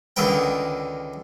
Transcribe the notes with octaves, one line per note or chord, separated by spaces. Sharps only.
C#2 D3 D#3 A#4 B4 G5